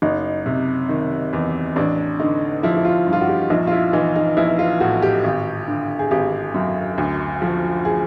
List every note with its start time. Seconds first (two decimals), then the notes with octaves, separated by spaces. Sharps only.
0.02 F#1 D#4
0.46 C3
0.89 D#3
1.33 E2
1.76 A1 D4
2.20 D3 D#4
2.63 F3 E4
2.77 E4
2.85 F4
3.07 G2
3.13 F4
3.21 F#4
3.28 G4
3.50 A#1 D#4
3.67 F4
3.72 E4
3.93 E3 D#4
4.16 D#4
4.37 A#1 E4
4.59 F4
4.80 A2 F#4
5.02 G4
5.24 G#1
5.67 D3
5.99 G#4
6.11 G#1 G4
6.54 F#2
6.98 D2
7.42 F3
7.85 G#4